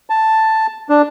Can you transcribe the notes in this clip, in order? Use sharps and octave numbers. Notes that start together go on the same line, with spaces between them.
A5
D4